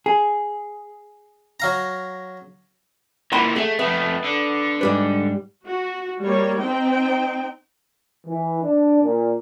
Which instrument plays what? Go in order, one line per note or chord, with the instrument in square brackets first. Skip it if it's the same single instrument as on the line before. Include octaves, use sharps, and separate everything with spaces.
[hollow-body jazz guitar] G#4
[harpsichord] F#3 F5 A#5
[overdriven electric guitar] A#2 E3 [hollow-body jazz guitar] F#5 B5 C6
[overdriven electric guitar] A3 [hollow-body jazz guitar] G#4 F#5
[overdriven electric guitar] F2 A3 [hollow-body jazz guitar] B3
[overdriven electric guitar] D3
[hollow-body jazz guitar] G#2 G3 B4
[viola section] F#4
G3 A#3 C#5
C4 D#4 G5
[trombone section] E3
D4
A#2